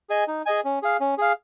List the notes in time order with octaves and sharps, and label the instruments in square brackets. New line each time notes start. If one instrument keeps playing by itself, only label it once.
[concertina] G#4 D#5 G#5
D#4
G#4 D#5 G#5
C#4
G#4 F5
C#4
G#4 F5